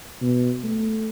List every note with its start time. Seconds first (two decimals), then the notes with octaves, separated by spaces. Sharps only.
0.21 B2
0.64 A3